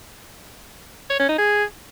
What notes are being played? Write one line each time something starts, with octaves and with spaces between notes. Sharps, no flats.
C#5
C#4
D#4
G#4